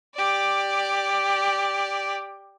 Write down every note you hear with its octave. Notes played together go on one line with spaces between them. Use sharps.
G4 D5